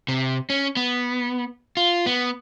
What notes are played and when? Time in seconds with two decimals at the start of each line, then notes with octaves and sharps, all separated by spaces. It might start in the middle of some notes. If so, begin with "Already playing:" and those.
0.08 C3
0.50 C#4
0.76 B3
1.77 F4
2.06 B3